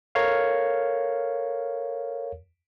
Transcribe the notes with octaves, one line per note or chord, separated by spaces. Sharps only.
A4 A#4 C#5 F5